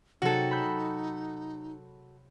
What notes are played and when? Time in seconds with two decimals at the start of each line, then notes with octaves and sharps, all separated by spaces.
0.22 C3 F#3 D#4 F#4 G#4 A4
0.51 B5 E6 G6